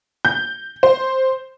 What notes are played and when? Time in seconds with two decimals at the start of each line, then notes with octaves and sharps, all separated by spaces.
0.25 G6
0.83 C5